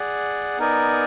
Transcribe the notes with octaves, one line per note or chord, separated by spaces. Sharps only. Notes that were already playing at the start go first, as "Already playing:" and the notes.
Already playing: G#4 D5 F#5
B3 D#4 A#4 D5 G#5